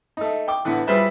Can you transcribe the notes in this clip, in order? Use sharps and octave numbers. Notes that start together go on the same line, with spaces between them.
A3 D#4
G5 D6
A2 D3 E3 B3 B4
G3 F4 G#4 B4 C5 E5